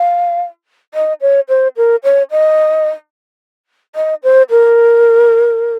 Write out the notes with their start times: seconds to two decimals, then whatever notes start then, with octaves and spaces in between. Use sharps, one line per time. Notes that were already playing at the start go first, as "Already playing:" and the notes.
Already playing: F5
0.94 D#5
1.21 C#5
1.49 C5
1.77 A#4
2.04 C#5
2.31 D#5
3.95 D#5
4.23 C5
4.50 A#4